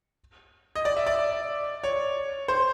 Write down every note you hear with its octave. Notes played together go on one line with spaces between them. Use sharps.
D#5
D5
E5
D5
C#5
C5